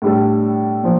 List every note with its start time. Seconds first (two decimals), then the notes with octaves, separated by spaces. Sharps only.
0.02 A2 G3 D4 A4
0.84 A#2 F3